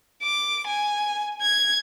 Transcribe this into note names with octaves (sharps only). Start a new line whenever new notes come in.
D6
G#5
G#6